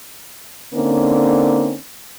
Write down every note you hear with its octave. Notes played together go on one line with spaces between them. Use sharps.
D3 A#3 C4 C#4 D#4